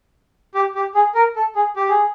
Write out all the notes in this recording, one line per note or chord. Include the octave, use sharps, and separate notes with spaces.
G4
G4
G#4
A#4
A4
G#4
G4
G#4